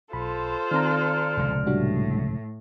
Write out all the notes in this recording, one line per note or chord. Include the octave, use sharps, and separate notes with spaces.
B1 F4 A4 C5 B5
D#3 C4 D5 A#5 F6
F1 C#2 A#2
A2 G3 D4 F#4